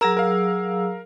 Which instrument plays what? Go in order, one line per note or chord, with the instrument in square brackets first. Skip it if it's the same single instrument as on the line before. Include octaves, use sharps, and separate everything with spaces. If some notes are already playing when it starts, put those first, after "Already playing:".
[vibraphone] F#3 G#4 E6 [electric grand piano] A#4 A#5 E7
[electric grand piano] A#4 F5